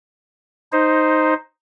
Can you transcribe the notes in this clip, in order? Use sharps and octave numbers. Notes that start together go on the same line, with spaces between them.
D#4 C5